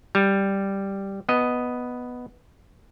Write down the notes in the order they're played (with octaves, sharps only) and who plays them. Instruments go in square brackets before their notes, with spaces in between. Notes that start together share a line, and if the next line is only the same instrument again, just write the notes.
[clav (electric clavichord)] G3
B3 D#5